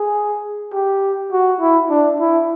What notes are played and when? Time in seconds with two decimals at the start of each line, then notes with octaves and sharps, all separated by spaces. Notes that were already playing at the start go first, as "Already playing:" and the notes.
Already playing: G#4
0.73 G4
1.32 F#4
1.61 E4
1.90 D4
2.20 E4